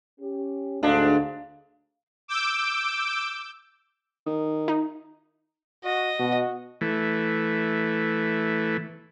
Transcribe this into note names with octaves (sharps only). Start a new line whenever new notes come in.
C#4 G4
D2 G#2 D3 D4 F5
D6 E6 G6 D7
D#3
D#4
F#4 D#5
B2 F#4
E3 A3